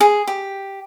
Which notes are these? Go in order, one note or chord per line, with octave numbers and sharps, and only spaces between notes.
G#4
G4